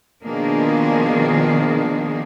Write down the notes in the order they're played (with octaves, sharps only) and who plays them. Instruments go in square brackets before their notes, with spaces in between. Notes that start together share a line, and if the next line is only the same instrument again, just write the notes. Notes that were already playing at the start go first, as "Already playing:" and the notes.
[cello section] B2 D#3 F3 A#3 D4 G#4